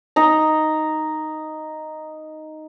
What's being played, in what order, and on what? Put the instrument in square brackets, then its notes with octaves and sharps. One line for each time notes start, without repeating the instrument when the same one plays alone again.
[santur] D#4 A#5